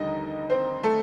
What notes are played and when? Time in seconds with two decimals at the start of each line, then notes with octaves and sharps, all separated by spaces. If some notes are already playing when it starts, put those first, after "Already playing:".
Already playing: F1 D#2 D3 G3 D#4 D#5
0.50 C4 C5
0.83 A3 A4